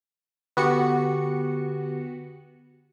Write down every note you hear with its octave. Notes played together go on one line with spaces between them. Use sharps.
D3 B3 F#4 G4 C#7